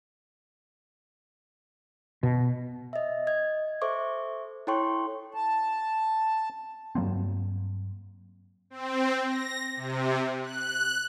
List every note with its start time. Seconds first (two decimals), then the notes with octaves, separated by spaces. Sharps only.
2.23 B2
2.93 D#5 E5
3.27 D#5 G#6
3.82 A4 C5 E5 C#6 D6
4.67 E4 A4 C#5 G5 C6 C#6
5.34 A5
6.95 G2 F#3 A#3 C4
8.70 C4
9.26 A#6
9.76 C3
10.42 F#6